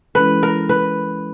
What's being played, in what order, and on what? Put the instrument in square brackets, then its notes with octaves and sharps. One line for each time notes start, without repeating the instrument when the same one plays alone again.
[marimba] E3 G#3 C#4 E4 A4 [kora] B4
[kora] A#4
B4